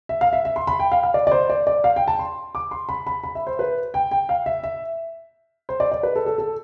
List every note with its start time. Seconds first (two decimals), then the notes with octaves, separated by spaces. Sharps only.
0.09 E5
0.21 F5
0.33 E5
0.45 E5
0.56 C6
0.67 B5
0.80 G5
0.92 F5
1.03 F5
1.14 D5
1.27 D5
1.31 C5
1.50 D5
1.67 D5
1.84 F5
1.96 G5
2.08 A5
2.19 C6
2.55 D6
2.71 C6
2.89 B5
3.07 B5
3.24 B5
3.35 E5
3.47 C5
3.59 B4
3.94 G5
4.11 G5
4.29 F5
4.46 E5
4.64 E5
5.69 C5
5.80 D5
5.92 D5
6.03 B4
6.16 A4
6.26 A4
6.38 A4